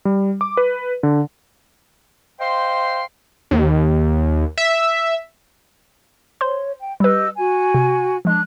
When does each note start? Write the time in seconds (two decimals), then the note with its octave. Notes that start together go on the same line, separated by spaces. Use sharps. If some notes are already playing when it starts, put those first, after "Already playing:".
0.05 G3
0.41 D6
0.57 B4
1.03 D3
2.40 C5 D#5 F5 G5 C6
3.51 D#2
4.58 E5
6.41 C5 C#5 C6
6.80 G5
7.00 G3 G4 B4 D#5 E6
7.37 F#4 G#5
7.74 C3
8.25 F3 G#3 D4 F#6